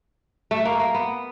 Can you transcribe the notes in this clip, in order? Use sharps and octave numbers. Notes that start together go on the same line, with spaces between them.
A3
A#3
A#3
B3